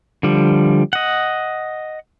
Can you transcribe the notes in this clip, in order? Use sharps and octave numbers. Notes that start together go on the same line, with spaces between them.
D3 F3 G3
D#5 F#5